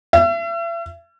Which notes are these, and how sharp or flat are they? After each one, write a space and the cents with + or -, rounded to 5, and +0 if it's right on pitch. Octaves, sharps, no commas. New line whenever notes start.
E5 +40